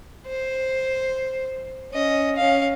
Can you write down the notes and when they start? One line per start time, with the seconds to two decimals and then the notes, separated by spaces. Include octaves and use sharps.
0.27 C5
1.91 C#4 D#5
2.37 C#4 F5